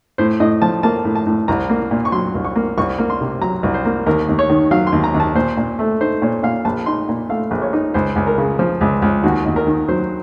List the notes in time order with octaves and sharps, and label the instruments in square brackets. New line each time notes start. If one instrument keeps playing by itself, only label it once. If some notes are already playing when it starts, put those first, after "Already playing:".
[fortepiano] A2 C5
A2 D#5
F3 A5
A#3 A5
A2
A5
A2
C2 A#5
A#3
A#2
C#6
F#3 C6
C2
C#6
A#3
C2 C#6
A#3
C6
C3
F#3 A#5
C2
C5
A#3
D#2 A#4
D#2
C#5
D#3
F#3 F5
C6
D#2
A#5
D#2
A5
A#2 C5
A#2
A3
D#4 C5
A#2 C#5
A#2 F5
A#1 A5
D#4 C6
A#2
A3 F5
A#1
C#5
D#4
C#2 C5
C#2
A#4
C#3
F3
C#2
C#2
D#2 F#4
D#2
A#4
D#3
F#3 C5